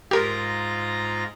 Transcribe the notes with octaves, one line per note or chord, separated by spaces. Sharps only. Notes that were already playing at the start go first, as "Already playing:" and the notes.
G#2 F4 G4 A#4 A#5